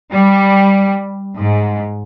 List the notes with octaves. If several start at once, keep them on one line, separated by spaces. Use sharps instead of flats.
G3
G#2